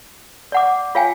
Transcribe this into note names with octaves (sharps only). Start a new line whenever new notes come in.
D5 F#5 D6
F4 C#5 F5 G5 G#5